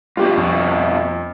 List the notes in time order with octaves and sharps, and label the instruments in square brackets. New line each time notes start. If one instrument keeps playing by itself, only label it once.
[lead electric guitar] G2 B2 [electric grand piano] F4 G4
[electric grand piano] F2